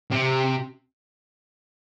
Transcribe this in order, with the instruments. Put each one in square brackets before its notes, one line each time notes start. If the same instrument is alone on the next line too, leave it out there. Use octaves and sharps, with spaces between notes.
[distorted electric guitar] C3